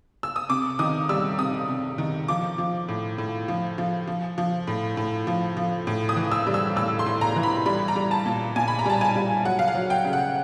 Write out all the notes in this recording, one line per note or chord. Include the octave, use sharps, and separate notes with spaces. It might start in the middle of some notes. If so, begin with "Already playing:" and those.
E6
D#6
C3 D6
D#3 D#6
G3 E6
C3 D#6
C3
D#3
F3 D6
F3
A2
A2
F3
F3
F3
F3
A2
A2
F3
F3
A2
D#6
E3
E6
G3
E6
A2 E6
C6
A2
A#5
E3
B5
G3 B5
A#5
G3
A5
A#2
A#2 G#5
B5
A#5
G3 A5
G#5
G3
F#3 F#5
F5
F#5
F#3
G5
C#3
F#5